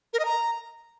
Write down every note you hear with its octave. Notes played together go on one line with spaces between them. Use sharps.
A#4
D#5
A#5